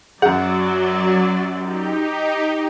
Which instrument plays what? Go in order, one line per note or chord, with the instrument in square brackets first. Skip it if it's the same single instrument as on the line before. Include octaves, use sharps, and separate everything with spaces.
[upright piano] F#2 F#5 [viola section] F#3 D5 [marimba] G#4
[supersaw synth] D#4 G4